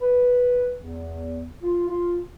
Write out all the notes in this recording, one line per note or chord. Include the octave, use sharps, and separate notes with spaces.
B4
E2
F4
F4